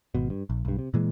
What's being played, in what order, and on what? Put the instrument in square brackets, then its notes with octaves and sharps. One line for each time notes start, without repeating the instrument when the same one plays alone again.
[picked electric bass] G#1 B2
G2
A#1
B1 G2
C3
A#2 E3 G#3